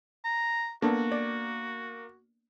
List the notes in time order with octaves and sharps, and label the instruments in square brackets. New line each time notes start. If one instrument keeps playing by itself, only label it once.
[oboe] A#5
[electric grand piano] A#3 [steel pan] B3 D4 A4 [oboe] F#4
[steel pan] D5